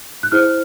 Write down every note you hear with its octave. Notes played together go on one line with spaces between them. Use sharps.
F#6
E4 G#4 C5 F6